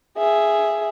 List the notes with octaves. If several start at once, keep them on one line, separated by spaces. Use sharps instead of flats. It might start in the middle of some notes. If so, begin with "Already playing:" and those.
G#4 E5